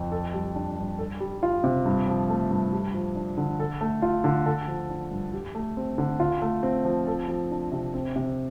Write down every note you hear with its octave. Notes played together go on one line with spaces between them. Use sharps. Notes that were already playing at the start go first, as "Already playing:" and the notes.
Already playing: F2
A4
G3
D4
G2
A4
G3
F4
C3
G2
F3
A3
G2
G4
F3
D4
D3
A4
A3
F4
D3
A4
F3
D4
G2
G4
A3
C4
D3
F4
A3
C4
F3
A4
F3
D4
C3
C4
C3